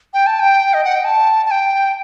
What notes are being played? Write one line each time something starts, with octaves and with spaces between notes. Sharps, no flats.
G5
A5
G5
D#5
F#5
G5
A5
A5
G5